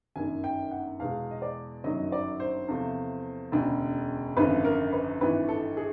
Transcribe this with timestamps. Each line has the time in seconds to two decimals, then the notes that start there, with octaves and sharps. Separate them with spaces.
0.16 G1 F#2 D#3 G#5
0.44 G5
0.71 F#5
0.99 E2 B2 G#3 F5
1.31 D#5
1.42 D5
1.84 G1 F#2 D#3 F#3 D#5
2.12 D5
2.40 C5
2.68 E2 C3 F3 A3
3.52 E1 D2 C#3
4.36 G#1 F#2 D3 F3 B4
4.65 A#4
4.93 B4
5.21 G#1 G2 E3 B4
5.49 A4
5.77 G#4